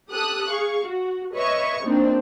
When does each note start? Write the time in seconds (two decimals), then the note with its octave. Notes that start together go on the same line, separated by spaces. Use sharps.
0.11 G4 A4 D#6 F#6
0.50 G#4 F5 C#6
0.85 F#4
1.35 B4 C#5 D#5 E5 C#6
1.85 A#2 C4 D4 D#4